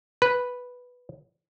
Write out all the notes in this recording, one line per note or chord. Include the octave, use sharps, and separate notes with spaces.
B4